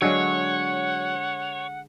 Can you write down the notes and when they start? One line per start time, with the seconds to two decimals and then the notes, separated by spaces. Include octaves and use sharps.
0.02 D3 F#3 G#3 C#5 F5 F#5